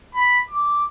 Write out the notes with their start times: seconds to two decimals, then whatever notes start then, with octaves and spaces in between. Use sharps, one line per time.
0.15 B5
0.50 D6